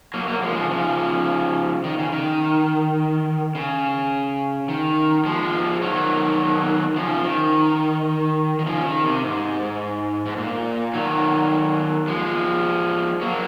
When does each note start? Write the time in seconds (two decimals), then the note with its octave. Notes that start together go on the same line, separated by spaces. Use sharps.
0.14 F#3 A#3
0.28 F#3 A#3
0.42 F3 G#3
0.56 C#3 F3
0.70 C#3 F3
1.84 D#3
1.98 C#3
2.12 D#3
3.55 C#3
4.68 D#3
5.25 F3 G#3
5.82 D#3 F#3
6.96 C#3 F3
7.24 D#3
8.59 D#3
8.66 C#3 F3
8.85 D#3
9.04 C3
9.24 G#2
10.26 G#2
10.37 A#2
10.94 D#3 F#3
12.08 F3 G#3
13.21 F#3 A#3